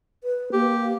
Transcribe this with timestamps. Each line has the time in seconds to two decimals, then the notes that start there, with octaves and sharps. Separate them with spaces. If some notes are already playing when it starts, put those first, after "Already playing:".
0.24 B4
0.53 A#3 G4